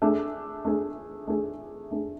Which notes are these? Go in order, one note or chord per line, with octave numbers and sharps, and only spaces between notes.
A3 D4 G#4
A3 D4 G#4
A3 D4 G#4
A3 D4 G#4